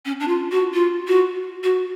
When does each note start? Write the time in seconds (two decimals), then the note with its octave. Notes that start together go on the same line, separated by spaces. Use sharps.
0.05 C#4
0.20 D4
0.27 F4
0.51 F#4
0.73 F4
1.07 F#4
1.63 F#4